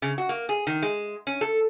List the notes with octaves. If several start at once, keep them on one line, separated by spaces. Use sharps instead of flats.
C#3
F#4
A#3
G#4
D#3
G#3
C#4
A4